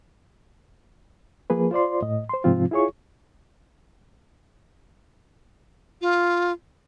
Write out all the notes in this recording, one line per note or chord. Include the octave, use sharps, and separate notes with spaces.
F3 A#3 G#4 B4
F4 C5 D5 C6
A2 D#5
C5 C6
G#2 C3 F3 C4 F4
E4 F4 G#4 C#5 C#6
F4